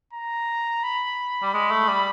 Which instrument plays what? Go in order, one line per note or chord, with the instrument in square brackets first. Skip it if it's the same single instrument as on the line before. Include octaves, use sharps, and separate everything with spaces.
[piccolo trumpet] A#5
B5
[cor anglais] G3
G#3
A3
G3